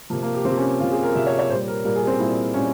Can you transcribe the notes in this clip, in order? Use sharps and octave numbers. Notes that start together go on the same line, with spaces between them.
C3 F3 A#3
A#3
G4
C3 F3 C4
C#4
C3 F3 F4
G#4
A#4
C3 F3 E5
C#5
C#5
A#2 G3 C5
A#4
A#2 G3 A#4
G#4
C4
A#2 G3 E4
A#2 G3 C#4